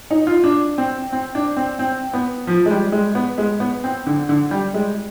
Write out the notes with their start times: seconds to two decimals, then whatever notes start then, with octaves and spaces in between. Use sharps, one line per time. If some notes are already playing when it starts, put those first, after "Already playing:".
0.11 D#4
0.27 F4
0.44 D4
0.78 C4
1.12 C4
1.35 D4
1.57 C4
1.79 C4
2.13 B3
2.47 F3
2.66 G#3
2.71 G3
2.92 G#3
3.15 B3
3.38 G#3
3.60 B3
3.84 C4
4.07 D3
4.29 D3
4.51 G3
4.74 G#3